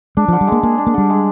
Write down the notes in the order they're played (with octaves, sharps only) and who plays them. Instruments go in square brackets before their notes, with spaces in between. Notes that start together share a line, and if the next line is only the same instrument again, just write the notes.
[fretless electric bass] G#3 [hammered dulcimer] D4
[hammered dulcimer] D3 [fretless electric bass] F3
[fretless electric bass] G3
[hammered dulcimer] G#3 [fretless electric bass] A#3
[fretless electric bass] A#3 [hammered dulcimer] G#4
[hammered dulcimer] D4
[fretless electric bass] A#3
[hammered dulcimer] D3 [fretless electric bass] G3
[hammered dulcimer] G#3